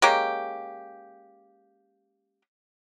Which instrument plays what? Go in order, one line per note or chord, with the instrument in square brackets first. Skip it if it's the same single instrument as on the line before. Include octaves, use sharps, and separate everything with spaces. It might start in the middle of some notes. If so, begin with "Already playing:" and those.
[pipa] G#3 A#3 C#4 G4